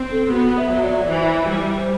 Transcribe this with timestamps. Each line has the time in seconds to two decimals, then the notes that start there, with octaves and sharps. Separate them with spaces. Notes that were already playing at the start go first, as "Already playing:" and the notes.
Already playing: C4
0.10 A4
0.30 B3 F#4
0.56 E5
0.69 F#3
0.82 D5
1.09 E3 C5
1.49 G3